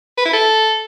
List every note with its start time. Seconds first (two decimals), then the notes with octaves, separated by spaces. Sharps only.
0.18 B4
0.25 E4
0.33 A4